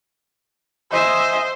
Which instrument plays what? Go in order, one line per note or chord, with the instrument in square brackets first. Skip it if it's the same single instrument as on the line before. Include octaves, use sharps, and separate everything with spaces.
[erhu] C5 [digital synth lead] D#5 [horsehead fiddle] E5 G#5